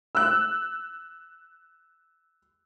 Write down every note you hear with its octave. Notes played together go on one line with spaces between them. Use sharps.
E6 F#6